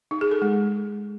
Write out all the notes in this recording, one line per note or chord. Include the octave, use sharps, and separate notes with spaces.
D#4
G#4
A4
G#3